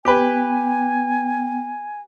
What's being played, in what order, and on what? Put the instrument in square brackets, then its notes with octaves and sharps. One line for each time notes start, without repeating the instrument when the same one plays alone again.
[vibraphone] B3 G5 [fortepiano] G4 B4 [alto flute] G#5